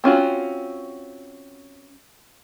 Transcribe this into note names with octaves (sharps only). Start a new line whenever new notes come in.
C4 C#4 F4 F#4